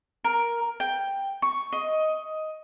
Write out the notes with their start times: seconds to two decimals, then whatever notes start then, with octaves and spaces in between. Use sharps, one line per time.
0.25 A#4
0.80 G5
1.42 C#6
1.73 D#5